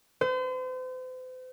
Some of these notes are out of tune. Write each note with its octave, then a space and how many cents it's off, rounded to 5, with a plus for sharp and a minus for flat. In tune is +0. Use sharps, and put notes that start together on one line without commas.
C5 -40